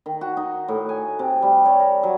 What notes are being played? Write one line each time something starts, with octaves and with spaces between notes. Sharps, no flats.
D#3
F#4
D#4
A2
G#5
C3
G3
C#5
A#4
F#3